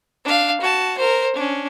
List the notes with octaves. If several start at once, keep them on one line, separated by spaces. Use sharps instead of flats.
D4 F5
F#4 A5
A#4 C5
C#4 D4